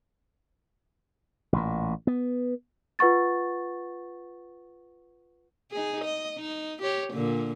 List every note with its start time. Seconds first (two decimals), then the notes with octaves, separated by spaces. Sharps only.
1.53 A1 A#2
2.07 B3
2.99 F4 B4 F#5 C#6 A6
5.71 D#4 G#4
6.04 D#5
6.38 D#4
6.82 G4 C#5
7.13 A#2 D3